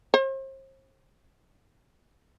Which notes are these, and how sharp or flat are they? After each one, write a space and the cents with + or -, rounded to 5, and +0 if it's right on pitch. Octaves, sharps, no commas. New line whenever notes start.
C5 +40